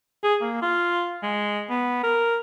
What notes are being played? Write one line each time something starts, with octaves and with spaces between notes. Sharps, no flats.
G#4
A#3
F4
G#3
B3
A#4